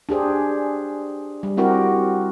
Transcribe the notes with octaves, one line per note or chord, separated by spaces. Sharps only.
D4 G4 G#4 C5
G3
C4 E4 F#4 G4 A#4